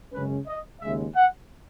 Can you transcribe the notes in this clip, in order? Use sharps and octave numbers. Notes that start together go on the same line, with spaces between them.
F#2 C#3 G#3 C#4 B4
D#5
D#2 C#3 G#3 E5
F#5